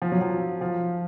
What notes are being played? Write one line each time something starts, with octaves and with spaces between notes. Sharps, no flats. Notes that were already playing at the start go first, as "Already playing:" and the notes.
F3
F#3
F3
F3